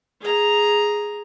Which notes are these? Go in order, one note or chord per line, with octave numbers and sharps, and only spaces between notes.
G#4 A#5